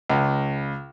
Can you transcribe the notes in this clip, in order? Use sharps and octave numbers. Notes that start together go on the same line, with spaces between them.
C#2